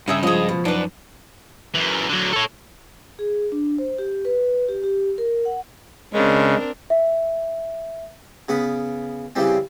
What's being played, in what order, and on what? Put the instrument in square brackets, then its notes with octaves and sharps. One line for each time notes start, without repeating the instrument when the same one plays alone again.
[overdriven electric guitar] G2 [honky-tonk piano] C#3 [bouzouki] D#4 G#4 E5
[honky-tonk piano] C#2 [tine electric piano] F3 [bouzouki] G#4 D#5
[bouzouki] B2
[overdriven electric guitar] F#2 [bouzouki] D4 B4 [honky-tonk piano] D#4
[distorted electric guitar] F#2 E3
D3 F#3
A4 C#5
[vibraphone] G#4
D4
C5
G4
B4
G4
G4
A#4
F#5
[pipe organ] C#3 [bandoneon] G#3 [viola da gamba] C4 D4 A#4
[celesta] E5
[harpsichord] C#3 B3 B4
C#3 E3 G3 C4